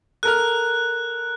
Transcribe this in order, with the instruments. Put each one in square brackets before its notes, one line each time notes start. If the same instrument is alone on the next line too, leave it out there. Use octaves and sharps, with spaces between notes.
[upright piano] A4 A#4 F6 [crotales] F#6